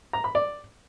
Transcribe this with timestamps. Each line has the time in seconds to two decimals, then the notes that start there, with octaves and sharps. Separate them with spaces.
0.13 A#5
0.24 B5
0.35 D5